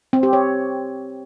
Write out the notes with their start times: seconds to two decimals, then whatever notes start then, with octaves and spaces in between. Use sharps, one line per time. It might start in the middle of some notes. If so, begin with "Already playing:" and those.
0.13 C4
0.23 G4
0.33 C#5